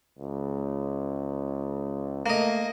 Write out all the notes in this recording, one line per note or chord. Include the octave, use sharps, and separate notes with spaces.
C#2
A3 A#3 D#5